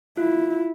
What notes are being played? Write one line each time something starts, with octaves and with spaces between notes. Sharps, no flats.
E4 F4